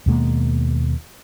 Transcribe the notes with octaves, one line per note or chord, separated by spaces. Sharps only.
D#2 B2 G#3 A#3